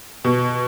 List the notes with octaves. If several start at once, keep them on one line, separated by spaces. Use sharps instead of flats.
B2